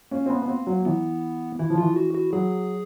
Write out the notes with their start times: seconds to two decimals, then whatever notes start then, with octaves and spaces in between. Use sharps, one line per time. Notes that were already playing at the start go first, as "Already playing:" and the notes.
0.11 A#3 C#4
0.26 C4
0.30 B3
0.42 B3
0.48 C4
0.67 F#3
0.85 E3 B3
1.59 E3 E4
1.70 F3
1.78 E3 F4
1.96 F#4
2.14 F#4
2.33 F#3 G#4